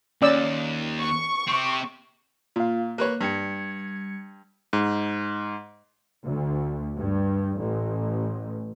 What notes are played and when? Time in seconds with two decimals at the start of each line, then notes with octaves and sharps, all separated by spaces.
0.22 D#2 C#4 D5 E6
1.01 C#6
1.47 C4 G4
2.56 A#2 F4 F5
2.98 A#3 B4 C#5 F#6
3.21 G2 G3 G#6 C#7
4.73 G#2
6.24 D2
6.96 G2
7.58 A1